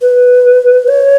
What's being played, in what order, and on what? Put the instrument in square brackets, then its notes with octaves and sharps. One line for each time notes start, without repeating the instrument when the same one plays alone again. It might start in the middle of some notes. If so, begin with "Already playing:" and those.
[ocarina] B4
C#5